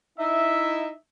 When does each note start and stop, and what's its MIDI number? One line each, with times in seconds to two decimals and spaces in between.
0.19 0.90 63
0.19 0.90 64
0.19 0.90 76